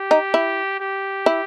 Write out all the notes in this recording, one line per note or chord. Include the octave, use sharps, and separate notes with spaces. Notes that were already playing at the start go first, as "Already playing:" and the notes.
Already playing: G4
D#4
E4
G4
E4